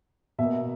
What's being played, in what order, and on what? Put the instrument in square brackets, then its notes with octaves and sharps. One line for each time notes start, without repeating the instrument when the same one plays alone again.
[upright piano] B2 A#3 E5